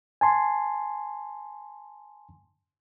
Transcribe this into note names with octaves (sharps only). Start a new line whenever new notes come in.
G#5 A5 C6